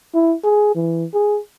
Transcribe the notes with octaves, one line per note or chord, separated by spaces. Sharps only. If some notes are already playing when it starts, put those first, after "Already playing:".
E4
G#4
E3
G#4